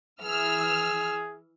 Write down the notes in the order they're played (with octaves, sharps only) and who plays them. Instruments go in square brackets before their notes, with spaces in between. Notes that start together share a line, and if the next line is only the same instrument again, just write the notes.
[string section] E3 E6 F6 [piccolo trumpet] G#4